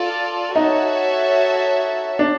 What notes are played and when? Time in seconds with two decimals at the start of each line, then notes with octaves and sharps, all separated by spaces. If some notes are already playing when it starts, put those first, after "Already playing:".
Already playing: F4 A4 D5
0.56 D#4 F#4 A4 C#5 E5
2.19 D4